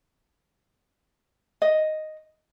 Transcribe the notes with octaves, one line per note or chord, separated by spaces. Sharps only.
D#5